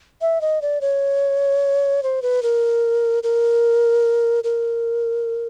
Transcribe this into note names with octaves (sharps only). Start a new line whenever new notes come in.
E5
D#5
D5
C#5
C5
B4
A#4
A#4
A#4